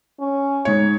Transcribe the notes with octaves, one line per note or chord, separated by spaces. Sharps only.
C#4
G#2 C#5